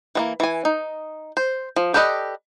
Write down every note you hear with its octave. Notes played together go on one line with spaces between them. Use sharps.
E3 G#3 A#3
E3 G#5
D#4
C5
F3
G4 A4 B4 D5 D#5